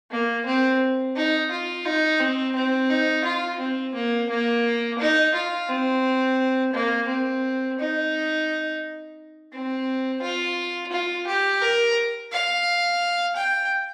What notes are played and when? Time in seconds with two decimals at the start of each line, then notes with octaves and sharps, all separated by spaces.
0.11 A#3
0.46 C4
1.16 D#4
1.51 F4
1.85 D#4
2.20 C4
2.55 C4
2.90 D#4
3.25 F4
3.60 C4
3.95 A#3
4.29 A#3
4.99 D#4
5.34 F4
5.69 C4
6.73 A#3
7.08 C4
7.79 D#4
9.53 C4
10.22 F4
10.92 F4
11.27 G4
11.62 A#4
12.32 F5
13.36 G5